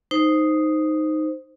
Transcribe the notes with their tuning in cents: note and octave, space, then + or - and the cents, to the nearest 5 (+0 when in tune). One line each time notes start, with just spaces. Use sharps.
D#4 +0 C5 -5